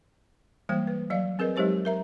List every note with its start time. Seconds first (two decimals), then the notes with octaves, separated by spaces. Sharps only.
0.69 E3 G3 G#3 A#3 C5 G5
0.87 B4
1.10 F3 F#3 D5 F5
1.39 C4 G#4 A#4 B4 D#5
1.56 F#3 G#3 D#4 G4 C5 C#5
1.85 A#4 E5 A#5